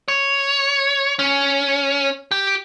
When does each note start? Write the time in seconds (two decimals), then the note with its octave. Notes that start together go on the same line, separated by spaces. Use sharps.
0.08 C#5
1.19 C#4
2.31 G4